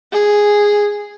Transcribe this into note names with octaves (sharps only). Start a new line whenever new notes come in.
G#4